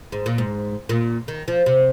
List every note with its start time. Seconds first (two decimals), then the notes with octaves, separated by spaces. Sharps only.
0.12 G#2
0.26 A#2
0.38 G#2
0.89 A#2
1.28 D#3
1.48 F3
1.66 C3